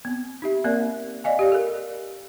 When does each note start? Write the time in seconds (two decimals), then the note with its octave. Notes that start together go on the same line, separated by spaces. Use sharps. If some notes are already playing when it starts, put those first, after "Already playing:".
0.05 B3 C4
0.42 D#4 G4 E5
0.64 A#3 C4 A#4 D5 E5
1.24 D5 D#5 F5 G#5
1.39 G4 D5 F5
1.52 A4 A#4